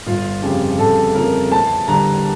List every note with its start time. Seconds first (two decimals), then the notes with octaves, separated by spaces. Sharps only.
0.06 G1 F4
0.42 F2 C#3 F3 G4
0.79 G1 A4
1.15 F2 C#3 F3 A#4
1.52 E2 A5
1.88 D3 G3 A#5